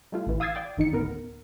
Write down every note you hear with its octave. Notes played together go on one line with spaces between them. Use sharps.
G3 A3 F4
A1 E3
F5 D#6 E6 G#6 A6 C7
D5 G5 A6
G1 D#3 D#4 C#7
D2 A2 B3 A#4